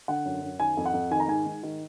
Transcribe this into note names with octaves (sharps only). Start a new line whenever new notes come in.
D3 F#5
F#2
F#2
D#3 G#5
F2
F#5
F2
D#3 G#5
A#5
G#2 G#5
G#2
D#3